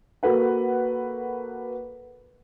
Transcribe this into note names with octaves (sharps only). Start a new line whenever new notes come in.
A#3 F#4 A4 B4 F#5